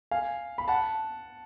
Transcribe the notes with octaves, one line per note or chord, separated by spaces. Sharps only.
F5 G#5
B5
F#5 A5